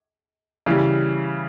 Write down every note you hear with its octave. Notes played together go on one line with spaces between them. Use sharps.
C#3 E3 G3